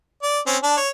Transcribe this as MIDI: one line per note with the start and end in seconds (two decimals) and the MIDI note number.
0.23 0.39 74
0.47 0.57 60
0.47 0.57 61
0.63 0.76 62
0.63 0.76 81
0.77 0.89 73